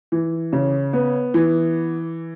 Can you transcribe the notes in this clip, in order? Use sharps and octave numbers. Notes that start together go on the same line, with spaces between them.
E3
C#3
B3
E3